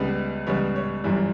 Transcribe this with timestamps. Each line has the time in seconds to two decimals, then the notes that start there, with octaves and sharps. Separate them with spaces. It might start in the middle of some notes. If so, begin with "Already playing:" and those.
Already playing: C#2 C#3 G3 B3 B4
0.47 C#2 C#3 G3 B3 C#5
0.76 C#5
1.04 G1 F#2 E3 G3